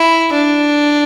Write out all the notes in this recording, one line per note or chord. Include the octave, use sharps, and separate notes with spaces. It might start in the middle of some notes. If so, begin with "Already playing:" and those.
Already playing: E4
D4